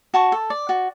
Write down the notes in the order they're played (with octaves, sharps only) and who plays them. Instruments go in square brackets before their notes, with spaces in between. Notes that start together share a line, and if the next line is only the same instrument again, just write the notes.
[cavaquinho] F#4 A5 C#6
A4
D5
F#4